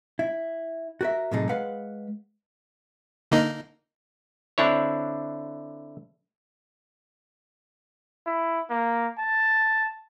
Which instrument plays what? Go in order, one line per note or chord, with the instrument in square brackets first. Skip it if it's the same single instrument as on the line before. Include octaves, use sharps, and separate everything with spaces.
[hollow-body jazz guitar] E4
F#4 A#4 E5
A2 C3 F#3 G#3 D#4 A4
G#3 B4 F5 F#5
[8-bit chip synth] D3 A#3 D#4
[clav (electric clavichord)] D3 C4 D4 E4 C#5
[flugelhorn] E4
A#3
A5